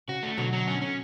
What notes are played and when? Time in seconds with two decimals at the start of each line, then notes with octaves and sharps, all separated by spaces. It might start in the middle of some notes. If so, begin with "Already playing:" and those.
0.08 C#3 F#4
0.23 A3
0.38 B2 D3 F#3
0.53 F#3
0.68 C#4
0.82 C#4